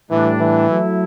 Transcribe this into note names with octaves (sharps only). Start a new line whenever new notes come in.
A2 E3 G3 D4
E3
F#3 A3 E4